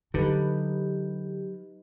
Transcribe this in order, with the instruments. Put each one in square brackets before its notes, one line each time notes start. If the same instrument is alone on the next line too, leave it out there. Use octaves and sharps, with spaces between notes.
[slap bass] D3 [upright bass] F#3 [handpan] D#4 B4 [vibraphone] G4